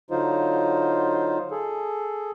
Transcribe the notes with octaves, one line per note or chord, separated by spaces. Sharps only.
D3 F#3 D#4 F4 C5
G#4 A4